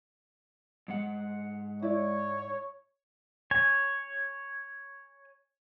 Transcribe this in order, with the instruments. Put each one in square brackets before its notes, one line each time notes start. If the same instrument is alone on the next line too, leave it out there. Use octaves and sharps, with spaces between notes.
[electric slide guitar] G#2 G#3 F#5
[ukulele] E4 D5 [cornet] C#5
[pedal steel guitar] C#5 G#5